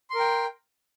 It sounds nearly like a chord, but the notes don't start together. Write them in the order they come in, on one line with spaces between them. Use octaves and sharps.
C6 A#4 G5